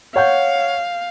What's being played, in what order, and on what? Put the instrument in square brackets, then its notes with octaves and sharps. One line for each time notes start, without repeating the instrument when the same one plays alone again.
[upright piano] C#5 F#5 G6 [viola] F5